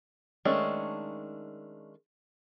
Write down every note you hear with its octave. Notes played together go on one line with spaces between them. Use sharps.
D#3 G#3 A3 C#4 D4